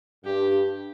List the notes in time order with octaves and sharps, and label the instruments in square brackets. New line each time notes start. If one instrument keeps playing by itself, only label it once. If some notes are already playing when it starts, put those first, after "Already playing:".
[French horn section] G2 [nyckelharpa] G4